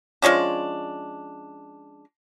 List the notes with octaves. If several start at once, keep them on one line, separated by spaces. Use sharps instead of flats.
F3 G#3 C#4 D4